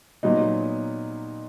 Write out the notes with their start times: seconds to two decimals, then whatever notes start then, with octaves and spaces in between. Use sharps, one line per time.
0.23 A#2 F#3 B3 D#4